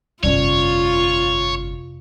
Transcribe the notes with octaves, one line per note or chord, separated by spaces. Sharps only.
G1 F2 C3 C#4 F4 C#5 D5